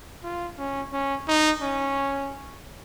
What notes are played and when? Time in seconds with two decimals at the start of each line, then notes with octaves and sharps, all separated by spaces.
0.23 F4
0.58 C#4
0.92 C#4
1.28 D#4
1.61 C#4